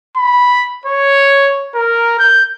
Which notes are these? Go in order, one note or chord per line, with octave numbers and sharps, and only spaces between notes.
B5
C#5
A#4
G6